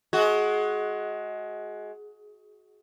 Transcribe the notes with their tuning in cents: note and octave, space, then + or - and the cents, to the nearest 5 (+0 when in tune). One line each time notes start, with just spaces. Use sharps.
G#3 +20 F#4 +0